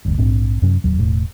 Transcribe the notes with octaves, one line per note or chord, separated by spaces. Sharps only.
F#1 D2 G2
A#1 G#2 C4 D4
F#2 C3 F#3 C#4
D1 D#2 F#3
E1 A2